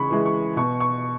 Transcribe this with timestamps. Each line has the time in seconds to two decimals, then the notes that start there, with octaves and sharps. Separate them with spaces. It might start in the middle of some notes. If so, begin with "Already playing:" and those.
Already playing: C#3 E3 G#3 B5 C#6
0.11 E3 G#3
0.26 C#6
0.56 B2 C#6
0.80 C#6